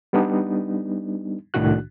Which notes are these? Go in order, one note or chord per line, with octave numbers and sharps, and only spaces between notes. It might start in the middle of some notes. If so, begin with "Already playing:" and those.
G3 B3 D4 D#4
C2 A2 D#3 D4 F#4 F#6